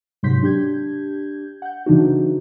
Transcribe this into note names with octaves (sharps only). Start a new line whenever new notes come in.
G#2 C3 F#3 C6 G6 B6
D4 G4 G6 G#6
F#5 G6
C#3 E3 D4 D#4 F#4